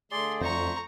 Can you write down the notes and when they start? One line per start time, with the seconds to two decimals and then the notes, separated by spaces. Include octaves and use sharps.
0.12 D3 A3 G#4 D5 C6
0.41 F2 C5 A#5 C#6